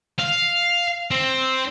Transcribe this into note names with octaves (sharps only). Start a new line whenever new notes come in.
F5
C4